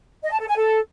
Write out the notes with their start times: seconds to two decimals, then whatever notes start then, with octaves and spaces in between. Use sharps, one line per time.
0.23 D#5
0.32 A5
0.40 A4
0.48 G#5
0.56 A4